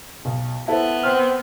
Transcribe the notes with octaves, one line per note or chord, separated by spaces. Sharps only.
B1
B3 E4 A4 C5 A5
C4 F6